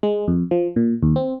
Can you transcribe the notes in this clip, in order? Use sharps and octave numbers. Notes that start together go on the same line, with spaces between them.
G#3
F2
F3
A#2
D#2
C4